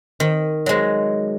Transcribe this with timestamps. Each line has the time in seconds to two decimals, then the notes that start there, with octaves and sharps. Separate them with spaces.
0.20 D#3
0.66 F#3 G#3